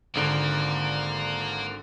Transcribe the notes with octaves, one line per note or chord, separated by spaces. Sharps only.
G#1 D3 A#3